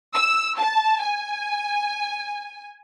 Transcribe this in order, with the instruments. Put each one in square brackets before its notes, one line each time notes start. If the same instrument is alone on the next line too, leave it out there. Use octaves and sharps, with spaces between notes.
[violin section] E6
A5
G#5